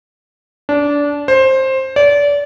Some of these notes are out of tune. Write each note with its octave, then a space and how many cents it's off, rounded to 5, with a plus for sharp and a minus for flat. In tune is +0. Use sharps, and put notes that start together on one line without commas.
D4 -20
C5 +15
D5 -30